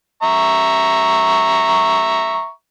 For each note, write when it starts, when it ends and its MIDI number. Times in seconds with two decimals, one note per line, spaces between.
0.23 2.50 76
0.23 2.50 82
0.23 2.50 85